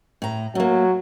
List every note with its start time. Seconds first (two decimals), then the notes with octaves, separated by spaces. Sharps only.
0.22 A2 A#5
0.55 F#3 A3 A#3